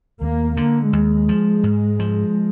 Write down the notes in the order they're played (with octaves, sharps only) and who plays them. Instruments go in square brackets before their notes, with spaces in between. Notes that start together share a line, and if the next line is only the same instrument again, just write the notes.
[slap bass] D#2 [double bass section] A#3
[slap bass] D3 [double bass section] A#3
[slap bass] D#2 [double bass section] G#3
[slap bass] F3
G#2
F3